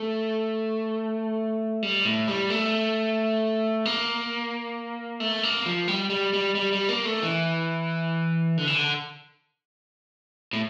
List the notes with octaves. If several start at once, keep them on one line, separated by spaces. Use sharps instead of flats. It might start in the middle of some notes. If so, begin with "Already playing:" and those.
Already playing: A3
G3
A2
G3
A3
A#3
A3
A#3
F3
G3
G3
G3
G3
G3
A#3
A3
E3
D3
E3
D3
A2